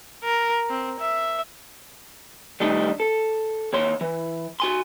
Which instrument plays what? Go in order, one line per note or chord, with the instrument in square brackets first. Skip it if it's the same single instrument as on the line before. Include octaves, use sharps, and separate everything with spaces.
[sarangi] A#4
C4
E5
[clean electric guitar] D#3 G3 A3 D4 D#4 D#5
A4
D#2 C#5 C6
E3
F#4 G#5 C6